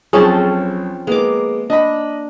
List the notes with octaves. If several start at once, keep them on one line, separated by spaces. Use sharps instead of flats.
B1 F3 C4 C#4 G#4 C#5 A5
G#3 A#3 B3 D6
D4 D#5 B5